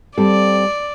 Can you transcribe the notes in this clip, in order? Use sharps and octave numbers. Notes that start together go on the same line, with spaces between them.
G3 C4 A4 D5